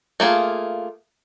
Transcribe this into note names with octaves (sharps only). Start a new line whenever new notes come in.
A3 A#3 F4 G#4